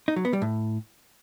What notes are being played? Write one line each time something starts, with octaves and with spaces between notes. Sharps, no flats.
D#4
F#3
B3
G3
A2